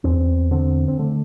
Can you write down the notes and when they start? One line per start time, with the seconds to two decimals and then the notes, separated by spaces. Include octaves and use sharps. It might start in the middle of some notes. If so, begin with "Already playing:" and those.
0.04 E2 C4
0.51 D3 C4
0.88 C4
0.99 D3 A3